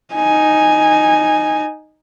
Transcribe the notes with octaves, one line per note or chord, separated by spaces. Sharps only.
D#4 G#5